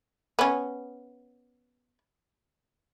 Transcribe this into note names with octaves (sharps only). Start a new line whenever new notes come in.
B3 C#4